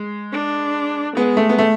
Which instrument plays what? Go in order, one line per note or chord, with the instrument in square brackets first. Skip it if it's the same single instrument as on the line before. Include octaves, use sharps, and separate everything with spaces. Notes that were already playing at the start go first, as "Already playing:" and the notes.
Already playing: [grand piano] G#3
[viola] D4
[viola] G#3 [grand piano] B3
[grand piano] A3
B3
A3